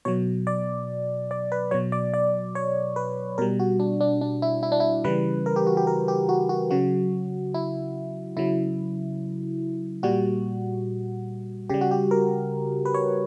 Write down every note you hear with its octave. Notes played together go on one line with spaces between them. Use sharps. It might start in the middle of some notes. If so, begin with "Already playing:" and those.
B2 F#3 C#5
D5
D5
B4
B2 F#3 C#5
D5
D5
C#5
B4
B2 G3 A#4
F#4
D4
D4
D4
E4
E4
D4
E4
C#3 E3 G3 B4
A#4
G4
F#4
G4
A#4
G4
F#4
F#4
C#3 F#3 F#4
E4
C#3 F#3 E4
A#2 G3 F#4
C#3 G3 G4
F#4
G4
A#4
B4
C#5